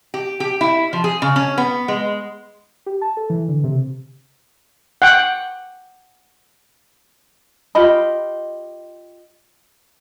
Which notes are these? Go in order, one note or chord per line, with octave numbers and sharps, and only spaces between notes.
G4
G4
E4
F3
G#4
C#3
C#4
B3
G#3
G4
A5
A4
E3
D3
C3
F#5 G5
F4 G4 D#5 B5